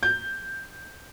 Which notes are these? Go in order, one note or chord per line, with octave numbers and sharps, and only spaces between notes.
G6